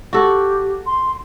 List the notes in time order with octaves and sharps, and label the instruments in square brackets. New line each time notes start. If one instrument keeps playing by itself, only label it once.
[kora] F#4 A4 [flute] G4
[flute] C6